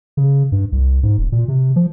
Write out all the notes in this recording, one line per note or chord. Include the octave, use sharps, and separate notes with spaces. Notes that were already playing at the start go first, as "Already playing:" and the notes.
C#3
G2
C2
G#2
D#1
A#2
C3
F3